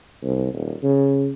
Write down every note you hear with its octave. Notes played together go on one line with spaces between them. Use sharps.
C2
D#1
C#3